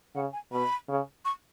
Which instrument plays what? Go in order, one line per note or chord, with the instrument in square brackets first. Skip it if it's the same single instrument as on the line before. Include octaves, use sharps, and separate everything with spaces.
[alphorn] C#3 [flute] F#5
[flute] G#5
[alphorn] B2 [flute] B5
[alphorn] C#3
[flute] C#6